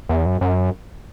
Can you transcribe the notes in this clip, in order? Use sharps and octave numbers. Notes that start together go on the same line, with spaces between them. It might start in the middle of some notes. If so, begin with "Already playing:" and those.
E2
F#2
F#2